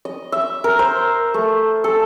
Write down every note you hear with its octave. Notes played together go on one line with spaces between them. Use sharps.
D#5
E5
A#4
C5
A3
A4